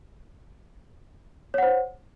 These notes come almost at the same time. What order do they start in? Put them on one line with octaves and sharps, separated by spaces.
C#5 F#5 C5